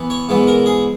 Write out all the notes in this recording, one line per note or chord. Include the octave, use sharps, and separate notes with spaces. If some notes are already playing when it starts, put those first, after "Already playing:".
Already playing: E3 B3
C#5
G#2 E3 B3
A#4
G#4